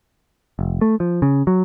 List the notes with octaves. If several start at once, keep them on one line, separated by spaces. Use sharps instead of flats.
F1
A3
F3
C#3
F#3